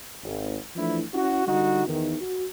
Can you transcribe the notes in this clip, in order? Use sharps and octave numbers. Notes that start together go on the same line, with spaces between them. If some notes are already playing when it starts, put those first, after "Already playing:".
G#1
E3 F3 A3 D4 E4
C#4 E4 F#4
D3 G3 D#4 F#4
E2 D#3
F#4